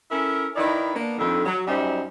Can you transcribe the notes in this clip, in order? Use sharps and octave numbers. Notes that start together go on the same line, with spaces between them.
C#4 E4 A4 A#4
D#3 D#4 E4 B4 D5
A#3 B3 D4
F2 D3 D#3
F#3
F#2 G3 D#4 C5 E5